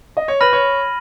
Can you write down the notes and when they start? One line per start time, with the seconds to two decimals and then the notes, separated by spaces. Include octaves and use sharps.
0.17 D#5
0.28 C#5
0.41 B4 B5 F6 A#6 D#7 F#7
0.53 C#5